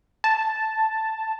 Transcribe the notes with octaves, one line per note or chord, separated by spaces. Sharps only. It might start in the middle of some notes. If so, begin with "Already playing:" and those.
A5